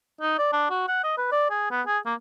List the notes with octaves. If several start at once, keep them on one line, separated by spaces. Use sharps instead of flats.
D#4
D5
D4
F#4
F#5
D#5
B4
D5
G#4
B3
G#4
A#3